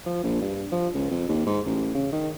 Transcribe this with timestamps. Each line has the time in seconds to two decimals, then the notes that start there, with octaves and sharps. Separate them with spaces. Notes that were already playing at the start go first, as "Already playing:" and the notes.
0.06 F3
0.23 A#1
0.41 G2
0.72 F3
0.95 C#2
1.10 F2
1.29 D#2
1.46 G#2
1.66 A1
1.95 C#3
2.12 D#3